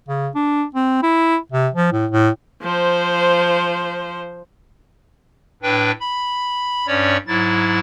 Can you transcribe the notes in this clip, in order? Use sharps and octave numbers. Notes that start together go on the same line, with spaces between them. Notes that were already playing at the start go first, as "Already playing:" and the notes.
C#3
D4
C4
E4
C3
F3
A2
A2
F3 C5
A2 D4 B4 G5
B5
G2 C#4 C#5 D5
G#2 F#3 E4 A6